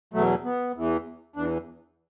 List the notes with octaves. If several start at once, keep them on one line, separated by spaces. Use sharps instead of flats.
E2 B2 F#3 A3
B3
E2 E3
E2 E3 D4